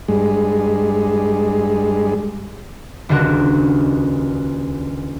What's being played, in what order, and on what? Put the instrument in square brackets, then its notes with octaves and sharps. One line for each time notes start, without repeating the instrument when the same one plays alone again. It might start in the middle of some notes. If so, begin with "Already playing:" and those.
[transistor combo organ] G2 G#3
[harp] D#1 C#2 D3 F#4 A#4 F#5